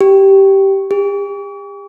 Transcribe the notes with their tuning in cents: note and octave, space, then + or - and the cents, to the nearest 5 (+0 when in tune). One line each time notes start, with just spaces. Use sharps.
G4 -10
G4 +40